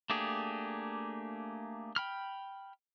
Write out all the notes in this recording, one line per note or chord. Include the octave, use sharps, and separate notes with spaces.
A3 A#3 D4 G4 G#4
G5 B5 F6